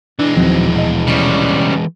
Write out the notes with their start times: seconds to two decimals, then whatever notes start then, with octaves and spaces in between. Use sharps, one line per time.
0.19 E3 G#3 D4
0.37 D#1 D#3 F3 F#3 C4
0.75 B2 D#5
1.07 C#3 G3